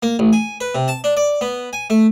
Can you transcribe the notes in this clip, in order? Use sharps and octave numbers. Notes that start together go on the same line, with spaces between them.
A#3
A1
G#5
B4
C3
A5
D4
D5
B3
G#5
A3